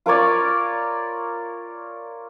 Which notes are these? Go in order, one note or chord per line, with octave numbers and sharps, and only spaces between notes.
F4 A#4 C#5 D5